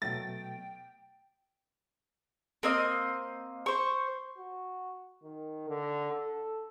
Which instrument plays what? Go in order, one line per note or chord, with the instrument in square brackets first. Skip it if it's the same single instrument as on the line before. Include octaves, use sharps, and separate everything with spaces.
[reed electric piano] B2 F#3 A3 [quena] G5 [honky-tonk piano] A6
[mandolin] A#3 C4 D#5
C5 C#6
[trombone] F#4
D#3
D3
A4